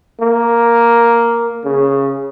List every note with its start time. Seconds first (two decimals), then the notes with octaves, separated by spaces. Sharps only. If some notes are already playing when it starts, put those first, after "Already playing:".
0.21 A#3
1.65 C#3